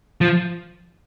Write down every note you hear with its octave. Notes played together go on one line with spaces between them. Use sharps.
F3